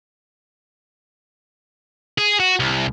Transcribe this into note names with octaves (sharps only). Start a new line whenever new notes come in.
G#4
F#4
C2